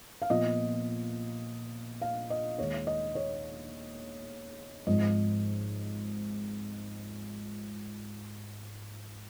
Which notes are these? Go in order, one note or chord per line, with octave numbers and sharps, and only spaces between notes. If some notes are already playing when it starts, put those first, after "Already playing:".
F5
A#2 F3 B3 F4 D#5
F5
D#5
D#2 D#3 G#3 C#5
D#5
C#5
G#1 G#2 F3 D#5